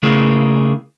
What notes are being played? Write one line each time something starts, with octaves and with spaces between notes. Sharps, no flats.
C#3 A3 A#3 E4 G#4